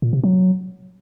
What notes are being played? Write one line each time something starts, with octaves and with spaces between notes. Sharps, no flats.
A#2
C3
F#3